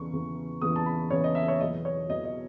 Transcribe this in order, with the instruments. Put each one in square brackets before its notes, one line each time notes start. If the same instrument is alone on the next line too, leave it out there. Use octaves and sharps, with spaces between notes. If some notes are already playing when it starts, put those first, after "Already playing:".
Already playing: [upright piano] E2 C#3 E3 C#6
E2 C#3 E3
E2 C#3 E3 D#6
A5
B5
E2 C#3 E3 C#5
D#5
E5
C#5
E2 B2 F#3 D#5
C#5
E2 B2 F#3 D#5
D#5